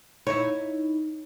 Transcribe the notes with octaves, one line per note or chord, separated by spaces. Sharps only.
D#4 E4 C#5